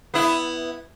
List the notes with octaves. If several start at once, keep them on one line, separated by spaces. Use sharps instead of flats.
B3 E4